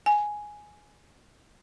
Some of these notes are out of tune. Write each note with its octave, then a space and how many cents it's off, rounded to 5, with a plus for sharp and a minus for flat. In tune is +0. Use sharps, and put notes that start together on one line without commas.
G#5 +5